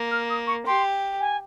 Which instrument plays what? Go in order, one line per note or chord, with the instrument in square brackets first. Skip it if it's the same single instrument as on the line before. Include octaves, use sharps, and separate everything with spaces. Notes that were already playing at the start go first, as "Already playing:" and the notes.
Already playing: [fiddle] A#3
[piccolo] F6
D#6
C#6
[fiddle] G4 [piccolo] C6
[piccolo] G#5